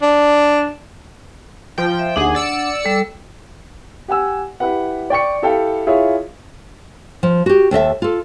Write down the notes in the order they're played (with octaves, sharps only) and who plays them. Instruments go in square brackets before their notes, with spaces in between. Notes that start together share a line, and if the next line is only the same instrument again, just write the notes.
[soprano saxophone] D4
[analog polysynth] F3 G5
[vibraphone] E5
[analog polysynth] D#2 G#4 [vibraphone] D4 F#5
[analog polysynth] D5 E6 C#7
[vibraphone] G3 A4
[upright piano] G4 F#5 G#5 E6
E4 G4 B4 F#5
D5 G5 C#6 C#7
E4 G4 A4 E5 F5 G5
E4 F4 G#4 C#5 E5 F5
[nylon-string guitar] F3
F#4 G4
D#2 A4 D#5 E5
F4 A4